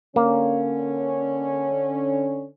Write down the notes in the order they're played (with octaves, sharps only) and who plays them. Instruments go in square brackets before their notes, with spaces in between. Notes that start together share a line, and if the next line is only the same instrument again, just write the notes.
[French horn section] D3 C#4 [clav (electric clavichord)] A#3